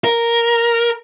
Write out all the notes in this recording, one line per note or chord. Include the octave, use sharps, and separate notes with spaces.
A#4